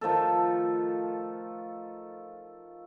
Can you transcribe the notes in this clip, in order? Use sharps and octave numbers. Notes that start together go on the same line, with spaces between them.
D#3 F3 A3 A4